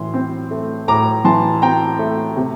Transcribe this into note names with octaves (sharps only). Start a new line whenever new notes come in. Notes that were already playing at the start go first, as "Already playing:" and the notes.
Already playing: A2 E3 C6
C4
A3
A2 A#5 D6
E3 A5 C6
C4 G5 A#5
A3
C3